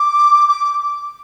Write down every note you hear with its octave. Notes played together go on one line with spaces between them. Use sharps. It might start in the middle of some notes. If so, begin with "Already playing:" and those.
Already playing: D6
D6